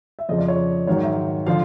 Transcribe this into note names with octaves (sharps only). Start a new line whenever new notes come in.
E5
F2 C#3 F3 D#5
D5
C#5
G#2 D#3 F#3 C#5
E5
D3 F3 F5